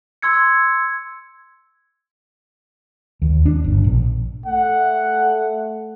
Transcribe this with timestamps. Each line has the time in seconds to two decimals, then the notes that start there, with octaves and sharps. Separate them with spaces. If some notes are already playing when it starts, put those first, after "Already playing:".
0.22 C6 E6 G#6 C#7
3.22 D#2
3.45 D4
3.64 G1
3.84 A#1
4.46 A3 F#5